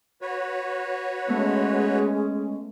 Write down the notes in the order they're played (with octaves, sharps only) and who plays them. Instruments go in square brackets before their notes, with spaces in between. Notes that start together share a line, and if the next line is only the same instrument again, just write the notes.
[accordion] F#4 B4 C#5
[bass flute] G#3 [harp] A3 B3 [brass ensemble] C#4